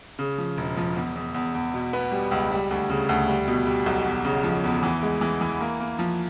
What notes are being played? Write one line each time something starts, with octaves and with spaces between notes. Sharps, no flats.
C#3
F3
E1
F3
E2
E2
E2
E2
B2
B3
G3
C#2
G3
D2
C#3
D2
G3
B2
G3
B1
E2
C#3
F3
E2
E3
G#3
E3
E3
A#3
A#3
F3